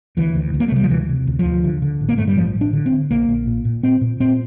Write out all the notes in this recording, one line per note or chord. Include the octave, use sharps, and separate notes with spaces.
D2 E3
D2
D2
A#3
A3
C3 G3
F3
D2 E3
C3
D2
F3
D2
D3
D3
A1
A#3
G2 A3
G3
A1 F3
A1
D4
D3
C4
D3
A#1 A#3
A#1
A#2
A#2
A#2 C4
A#2
A#2 C4